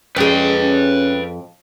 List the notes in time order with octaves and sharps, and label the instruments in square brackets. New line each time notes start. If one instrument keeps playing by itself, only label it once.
[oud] F2 G#4 [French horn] C#4 [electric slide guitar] B4 G5
[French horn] C#4